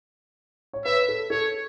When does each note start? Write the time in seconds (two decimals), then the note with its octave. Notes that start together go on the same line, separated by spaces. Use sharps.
0.73 C#5
0.85 B4 E5
1.08 A4
1.30 A4 C#5